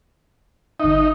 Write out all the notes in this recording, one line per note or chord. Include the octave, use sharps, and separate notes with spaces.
G1 D#4 E5